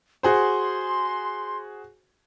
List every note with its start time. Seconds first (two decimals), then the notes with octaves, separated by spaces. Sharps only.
0.23 F#4 G#4 C5 C6